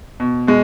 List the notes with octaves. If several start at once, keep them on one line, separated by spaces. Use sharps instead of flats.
B2
B2 G#3